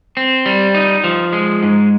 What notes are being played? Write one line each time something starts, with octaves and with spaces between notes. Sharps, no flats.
C4
G3
D#4
F3
G#3
G#2